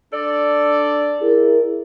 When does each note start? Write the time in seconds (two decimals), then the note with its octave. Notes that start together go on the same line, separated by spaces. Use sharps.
0.13 D4 A4 D5
1.22 E4 G#4 A#4